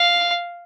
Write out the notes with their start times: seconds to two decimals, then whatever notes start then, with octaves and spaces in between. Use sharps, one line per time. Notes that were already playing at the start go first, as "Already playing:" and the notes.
Already playing: F5